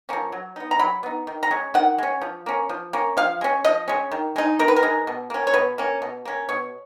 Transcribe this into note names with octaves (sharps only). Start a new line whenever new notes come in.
F3 A#3 C#4
F#3
B3 D#4
A#5
F#3 B5
B3 D#4
D#3
A#5
G#3 C#4
D#3 F#5
G#3 C#4
F3
A#3 C#4
F3
A#3 C#4
F3 F5
G#3 C#4
F3 D#5
G#3 C#4
D#3
G#3 D#4
D#3 A#4
B4
A#4
G#3 D#4
B2
A#3 C#4
C#5
B2 B4
A#3 C#4
B2
A#3 C#4
B2 C#5